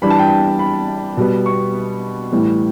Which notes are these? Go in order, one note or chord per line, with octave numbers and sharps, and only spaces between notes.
E3 G3 D4 B5
A5
G5
A5
B5
B2 G3 B3
C#6
A2 E3 G3